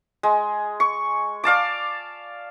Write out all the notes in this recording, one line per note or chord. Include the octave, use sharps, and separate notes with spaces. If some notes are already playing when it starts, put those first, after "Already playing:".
G#3
C#6
D5 F5 A5 D6